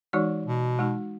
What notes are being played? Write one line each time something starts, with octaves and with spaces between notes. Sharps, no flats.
E3 G#3 D#4 F#4 C#5
B2
G#3 D#4 F#4